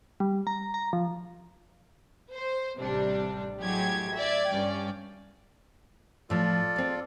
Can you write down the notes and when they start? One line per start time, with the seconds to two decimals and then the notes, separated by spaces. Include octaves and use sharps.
0.20 G3
0.47 A#5
0.74 A#5
0.93 F3
2.33 C5
2.79 A1 C3 G3 D4
3.61 A2 F#3 G#3 G4 G#6
4.15 D5 E5 G#6
4.47 G2 C#4 D5 G5
6.30 A2 F3 F4 A4 D5
6.76 G#3 C4